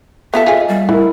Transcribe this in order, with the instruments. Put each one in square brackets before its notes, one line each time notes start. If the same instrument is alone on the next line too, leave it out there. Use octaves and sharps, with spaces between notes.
[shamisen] B3 F4 A4 [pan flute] E5
[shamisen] F4 G#4 [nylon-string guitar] D#5 G#5
[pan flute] G3
[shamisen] D3 [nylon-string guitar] E4 A#4